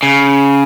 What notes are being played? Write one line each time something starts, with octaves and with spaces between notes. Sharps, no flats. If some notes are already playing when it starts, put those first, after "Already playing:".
C#3